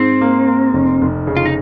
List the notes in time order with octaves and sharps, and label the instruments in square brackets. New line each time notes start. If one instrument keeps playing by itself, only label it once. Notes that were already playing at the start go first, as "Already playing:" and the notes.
Already playing: [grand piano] G#2 G#3 [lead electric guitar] C4
[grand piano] A#3
A#3
F1
F1
C#3
[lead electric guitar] F4
D#4